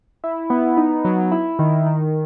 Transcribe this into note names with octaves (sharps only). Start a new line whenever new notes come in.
E4
B3
D#4
F#3
E4
D#3
D#3